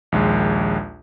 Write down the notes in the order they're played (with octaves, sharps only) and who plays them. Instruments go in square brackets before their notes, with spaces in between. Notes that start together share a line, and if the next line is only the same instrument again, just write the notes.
[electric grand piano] A#1 D#2 G#3